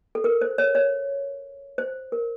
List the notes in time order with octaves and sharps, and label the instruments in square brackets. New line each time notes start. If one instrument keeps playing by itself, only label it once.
[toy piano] A4
A#4
C5
C#5
C#5
C5
A#4